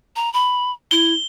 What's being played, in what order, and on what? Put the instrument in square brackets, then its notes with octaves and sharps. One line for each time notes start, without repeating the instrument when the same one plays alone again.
[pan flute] A#5
B5
[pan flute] E4 [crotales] G7